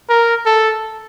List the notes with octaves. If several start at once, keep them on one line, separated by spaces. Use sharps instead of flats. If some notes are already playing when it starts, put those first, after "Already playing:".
A#4
A4